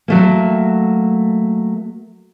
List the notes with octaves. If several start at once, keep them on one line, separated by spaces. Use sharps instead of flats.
F#3 A3 A#3